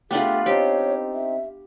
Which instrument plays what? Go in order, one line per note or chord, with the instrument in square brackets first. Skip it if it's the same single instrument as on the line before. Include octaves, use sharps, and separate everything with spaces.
[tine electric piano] A3 G4 [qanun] B3 D4 F4 [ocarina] G#4
[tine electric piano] C4 D#4 [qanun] G4 [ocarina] C#5
[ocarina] E5